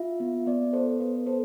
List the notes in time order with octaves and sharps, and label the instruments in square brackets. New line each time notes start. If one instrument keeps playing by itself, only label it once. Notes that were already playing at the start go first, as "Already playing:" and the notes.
Already playing: [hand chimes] F4 E5
B3
B3 D5
A4 C5
B3 B4
A4 C5